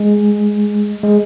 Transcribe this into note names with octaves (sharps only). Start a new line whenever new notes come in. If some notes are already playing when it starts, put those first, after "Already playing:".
Already playing: G#3
G#3